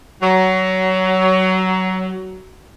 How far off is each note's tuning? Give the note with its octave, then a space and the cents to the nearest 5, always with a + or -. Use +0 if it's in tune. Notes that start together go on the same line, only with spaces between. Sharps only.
F#3 +20